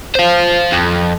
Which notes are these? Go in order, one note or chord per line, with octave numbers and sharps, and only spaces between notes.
C5 F5
F2